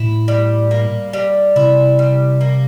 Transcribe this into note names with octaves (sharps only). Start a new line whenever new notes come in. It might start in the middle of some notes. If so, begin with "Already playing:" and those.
Already playing: A2 E4
G3
A#3
G3
C3 E4
G3
A#3